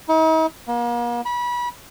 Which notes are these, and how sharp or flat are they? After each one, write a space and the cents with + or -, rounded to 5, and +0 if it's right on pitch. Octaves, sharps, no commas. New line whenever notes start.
D#4 +45
A#3 +40
B5 -30